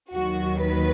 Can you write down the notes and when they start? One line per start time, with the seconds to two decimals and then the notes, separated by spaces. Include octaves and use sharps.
0.12 D#2 D#3 F#3 F#4
0.61 B4